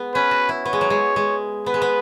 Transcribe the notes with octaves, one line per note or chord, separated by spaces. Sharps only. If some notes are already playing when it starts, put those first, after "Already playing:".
Already playing: G#3 B3
C#4 B4
F#4
E4
B3 C#5
G#3
F#3
G#3
G#3
B3 B4
G#3
B3